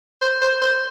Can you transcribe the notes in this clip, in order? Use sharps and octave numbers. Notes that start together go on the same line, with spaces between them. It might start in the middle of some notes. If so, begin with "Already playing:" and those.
C5
C5
C5